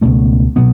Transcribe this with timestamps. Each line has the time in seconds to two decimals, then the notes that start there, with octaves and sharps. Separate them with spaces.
0.01 C#2 B2 A3 C#4
0.56 B2 F#3 B3